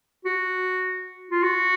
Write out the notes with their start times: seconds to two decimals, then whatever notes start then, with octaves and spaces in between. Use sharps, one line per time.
0.25 F#4
1.31 F4
1.43 F#4